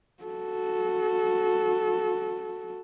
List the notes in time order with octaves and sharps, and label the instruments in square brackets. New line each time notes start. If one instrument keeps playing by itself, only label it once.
[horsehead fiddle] F#4 A4